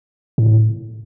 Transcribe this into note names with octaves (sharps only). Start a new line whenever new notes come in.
A2